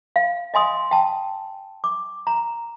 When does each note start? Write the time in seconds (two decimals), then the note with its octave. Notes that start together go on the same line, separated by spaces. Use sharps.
0.16 F5
0.54 D#5 G#5 C6 D#6
0.91 G5 A5
1.84 D6
2.27 A#5